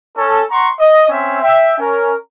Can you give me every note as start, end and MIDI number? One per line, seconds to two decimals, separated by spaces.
0.17 0.43 61
0.17 0.43 69
0.50 0.69 78
0.50 0.69 82
0.50 0.69 84
0.50 0.69 85
0.79 1.06 75
1.09 1.40 60
1.09 1.40 61
1.09 1.40 76
1.42 1.75 76
1.42 1.75 79
1.79 2.14 61
1.79 2.14 70